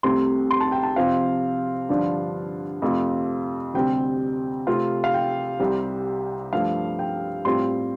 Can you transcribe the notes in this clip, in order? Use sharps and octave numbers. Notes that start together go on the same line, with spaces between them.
C2 C3 A3 C4 C6
C6
A5
G5
A5
C3 F3 C4 F4 F5
G2 D3 F3 D4 F4
F2 C3 A3 F4
D2 C3 G3 C4 G5
C3 A3 C4 F4 F5
F5
G5
C2 C3 G3 C4
G2 F3 A3 F5
G5
A2 G3 C4 F4 C6